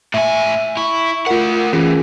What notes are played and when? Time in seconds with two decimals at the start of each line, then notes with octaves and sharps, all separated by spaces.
0.14 A2 E5 G#5
0.77 E4 C#6
1.26 A3 F4 A#4 F#5
1.73 E3 C#4 F4 G#4